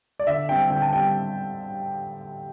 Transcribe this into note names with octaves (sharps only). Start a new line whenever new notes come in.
D5
D3 E5
G3 C4 G5
D3 G5
A5
G3 C4 G5